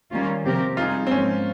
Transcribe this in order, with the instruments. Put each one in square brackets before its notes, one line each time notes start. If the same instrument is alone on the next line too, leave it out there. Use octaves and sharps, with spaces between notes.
[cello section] D#3 G3 A#3 C#4 F4
C3 F3 C4 G4 A#4
[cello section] G3 C4 D#4 G#4 [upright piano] F4
[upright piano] C4
[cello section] G#2 F3 A#3 [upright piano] C#4